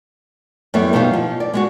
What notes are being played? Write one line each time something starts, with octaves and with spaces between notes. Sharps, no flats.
F#2 E3 G3 A3 B3
B2 E3 D#4 F4 G4 F5
F3
D5
G#3 B3 F#4